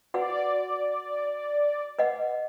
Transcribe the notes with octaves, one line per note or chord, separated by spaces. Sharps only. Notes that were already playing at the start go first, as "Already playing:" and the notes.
F#4 B4 D5 F#5
B4 D#5 F#5